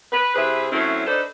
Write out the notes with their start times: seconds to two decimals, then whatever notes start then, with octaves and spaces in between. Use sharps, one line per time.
0.12 B4
0.35 C3 E4 G#4 B4
0.72 F#3 A3 C4 C#4 E4
1.07 D4 D#4 A4 B4 C5